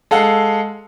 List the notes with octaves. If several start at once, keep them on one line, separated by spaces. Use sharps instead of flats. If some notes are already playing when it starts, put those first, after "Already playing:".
G#3 A4 F5 F#5